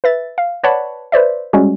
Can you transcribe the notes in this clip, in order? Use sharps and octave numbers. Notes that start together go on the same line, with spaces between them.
B4 E5 A6
F5
B4 C#5 D5 F#5 A5 B5
B4 C5 D5 E5
G3 G#3 C#4 F#4